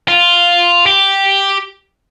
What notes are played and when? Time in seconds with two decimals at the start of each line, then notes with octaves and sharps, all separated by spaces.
0.08 F4
0.86 G4